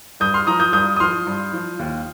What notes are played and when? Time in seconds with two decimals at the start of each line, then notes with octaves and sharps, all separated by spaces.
0.20 G2 D#6 G6
0.34 C6 F6
0.47 F3 A#5 D#6
0.60 D#6 G6
0.73 G2 D#6 G6
0.96 D#6
1.00 F3 C6 F6
1.26 G2
1.53 F3
1.79 D#2